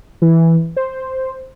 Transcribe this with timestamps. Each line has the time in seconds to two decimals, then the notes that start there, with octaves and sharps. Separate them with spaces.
0.22 E3
0.77 C5